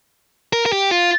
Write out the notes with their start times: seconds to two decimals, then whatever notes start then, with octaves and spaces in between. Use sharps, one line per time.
0.53 A#4
0.66 A#4
0.72 G4
0.91 F4